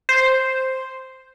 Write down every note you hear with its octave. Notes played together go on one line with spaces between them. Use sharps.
C5